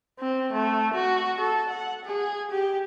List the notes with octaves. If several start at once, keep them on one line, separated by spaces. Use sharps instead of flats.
C4
A3
F#4
A4
F#5
G#4
G4